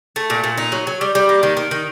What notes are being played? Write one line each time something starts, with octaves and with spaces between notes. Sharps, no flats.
A3
A#2
A#2
D#4
F#3
F#3
G3
G3
A#3
D#3
D#3
D#3